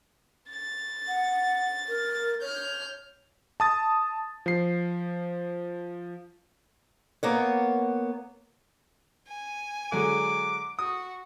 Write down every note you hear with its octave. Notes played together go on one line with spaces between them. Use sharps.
A6
F#5
A#4
C#5 F6 G6
A5 D#6 A6
F3 C7
A#3 B3 C#5
G#5
D3 F#3 G#3 D6
F#4 D#6